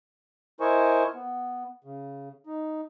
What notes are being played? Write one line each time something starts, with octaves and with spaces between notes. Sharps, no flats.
E4 A#4 C5 D#5 G#5 C#6
B3
C#3
D#4